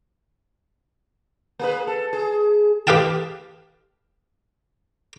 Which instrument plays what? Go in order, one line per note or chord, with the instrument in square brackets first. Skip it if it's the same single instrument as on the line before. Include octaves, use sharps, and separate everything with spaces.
[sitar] A#3 G#4 B4
A4
G#4
[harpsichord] G4 B4 D#5 F5 G5 A5